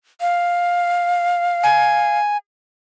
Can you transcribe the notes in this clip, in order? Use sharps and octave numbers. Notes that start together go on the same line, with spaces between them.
F5
G#5